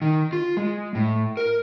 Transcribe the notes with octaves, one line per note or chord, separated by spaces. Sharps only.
D#3
F4
G#3
A2
A#4